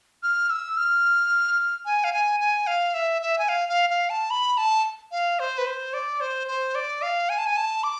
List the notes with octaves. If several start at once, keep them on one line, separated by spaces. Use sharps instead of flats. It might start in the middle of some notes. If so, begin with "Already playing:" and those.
F6
E6
F6
G#5
F5
G#5
G#5
F5
E5
E5
G#5
F5
F5
F5
A5
B5
A5
F5
C5
B4
C5
D5
C5
C5
D5
F5
G#5
A5
G#5
A5
D6